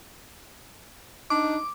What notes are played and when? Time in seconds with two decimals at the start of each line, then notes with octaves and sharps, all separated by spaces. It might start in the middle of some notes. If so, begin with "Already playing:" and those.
1.30 D4 D#4 D6